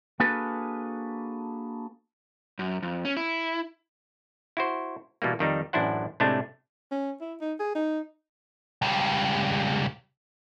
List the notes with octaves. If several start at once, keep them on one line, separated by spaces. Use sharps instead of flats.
A#3 D4 F#4 G#4 A4 B4
F#2
F2
C#4
E4
E4 F#4 C5
B2 E3 G3 A#3
F2 D#3 G3 D#4
A1 F#2 D4 E4 C5 F#5
A2 C3 G#3 A3 D4
C#4
E4
D#4
G#4
D#4
C#2 G3